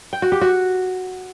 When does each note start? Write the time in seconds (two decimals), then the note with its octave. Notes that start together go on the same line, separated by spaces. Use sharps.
0.13 G5
0.22 F#4
0.32 G4
0.41 F#4